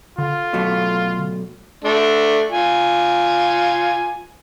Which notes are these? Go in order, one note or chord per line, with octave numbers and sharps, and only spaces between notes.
D3 F4
B2 F#3 A3
A3 D4
F4 G#5